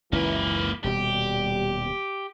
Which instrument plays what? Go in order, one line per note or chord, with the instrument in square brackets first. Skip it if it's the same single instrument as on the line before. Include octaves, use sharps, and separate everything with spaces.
[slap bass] F#1 C#2 C#4 [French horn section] E3 E4 [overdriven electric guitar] A#3 B4
[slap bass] D#1 B2 [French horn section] G3 [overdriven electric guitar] G4